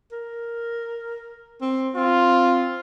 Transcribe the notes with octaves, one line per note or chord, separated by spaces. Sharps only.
A#4
C4
C4 F4